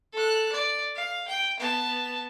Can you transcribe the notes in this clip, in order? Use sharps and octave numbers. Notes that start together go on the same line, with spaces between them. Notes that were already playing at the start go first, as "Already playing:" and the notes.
A4 F#6
D5
F5
G5
B3 A5